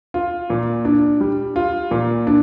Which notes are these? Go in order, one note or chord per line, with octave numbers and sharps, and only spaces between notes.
F4
A#2
D4
G3
F4
A#2
D4